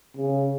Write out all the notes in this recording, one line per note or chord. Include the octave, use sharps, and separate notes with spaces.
C#3